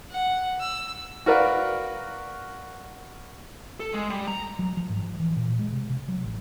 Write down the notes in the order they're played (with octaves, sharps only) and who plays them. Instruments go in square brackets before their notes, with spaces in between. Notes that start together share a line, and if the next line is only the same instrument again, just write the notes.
[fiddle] F#5
E6
[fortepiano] F#4 A#4 B4 D5 F5
[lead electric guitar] A4
G#3
G3
A#5
[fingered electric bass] F#3
F3
G#2
F3
E3
A#2
G#3
C3
C3
F#3
A1